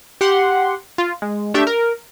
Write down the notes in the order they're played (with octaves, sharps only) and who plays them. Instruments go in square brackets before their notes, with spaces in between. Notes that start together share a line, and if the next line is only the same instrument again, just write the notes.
[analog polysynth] G4 F#5 C6
F4
G#3
A3 D4 G4 E5
A#4